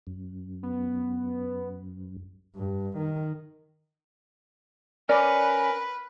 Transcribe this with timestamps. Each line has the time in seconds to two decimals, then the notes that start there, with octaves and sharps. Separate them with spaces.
0.07 F#2
0.63 B3
2.56 G2
2.97 D#3
5.09 C#4 A#4 B4 D5